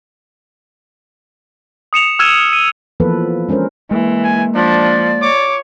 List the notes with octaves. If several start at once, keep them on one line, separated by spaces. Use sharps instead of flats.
D#6 C#7 E7 F7
E6 F6 G#6 D#7 E7
D#7
E3 F3 A#3 B3 A4 B4
G#3 C#4 D4 A#4 C5
E3 G#3 A#3
G#5
F3 D4 D5
C#5 D6